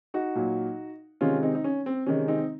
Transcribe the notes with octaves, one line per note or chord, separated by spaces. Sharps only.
D#4 F#4
A#2 F#3
C3 D#3 G#3 C#4 F4
C4 D#4
D#4
C#4
C4
C3 D#3 G#3 C#4
C4 D#4